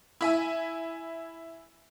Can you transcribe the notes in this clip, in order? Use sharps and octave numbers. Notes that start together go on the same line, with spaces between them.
E4 E5 G#5